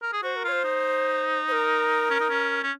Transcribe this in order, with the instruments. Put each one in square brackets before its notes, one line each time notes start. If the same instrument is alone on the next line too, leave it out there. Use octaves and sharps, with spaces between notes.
[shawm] A#4
G#4
[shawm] F#4 [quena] C5
[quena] A#4
[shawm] F4 [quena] C#5
[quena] C5
[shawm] D#4
[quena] C5
A#4
[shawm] C#4
D#4
C#4
C#4